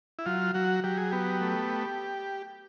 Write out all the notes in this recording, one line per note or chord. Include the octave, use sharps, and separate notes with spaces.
E4
F#3 F4
F#3 F#4
F#3 G4
G#4
B3 G4
A3